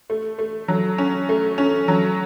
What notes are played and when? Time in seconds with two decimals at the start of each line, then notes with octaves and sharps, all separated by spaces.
0.10 A3
0.39 A3
0.68 F#3
0.98 C#4
1.29 A3
1.58 C#4
1.88 F#3